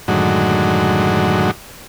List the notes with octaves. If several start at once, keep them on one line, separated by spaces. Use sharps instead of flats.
F#2 A2 D3 D#3 F#3 G#3